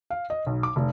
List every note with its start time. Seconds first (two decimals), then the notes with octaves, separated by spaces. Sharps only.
0.10 F5
0.30 D#5
0.46 B1
0.63 D6
0.76 F1